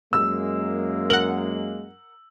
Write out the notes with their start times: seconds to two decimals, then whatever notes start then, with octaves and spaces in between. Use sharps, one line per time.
0.13 F#2 G#3 A#3 E6
1.10 A#4 F#5 F#7